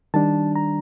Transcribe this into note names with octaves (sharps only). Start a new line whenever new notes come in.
D#3 G3 D4 A5
A#5